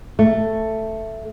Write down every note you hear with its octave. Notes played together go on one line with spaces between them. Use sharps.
A3